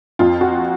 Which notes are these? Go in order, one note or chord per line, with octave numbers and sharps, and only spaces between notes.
F2 F4
F#4